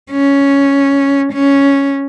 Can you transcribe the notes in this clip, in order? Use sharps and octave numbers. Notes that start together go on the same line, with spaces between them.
C#4
C#4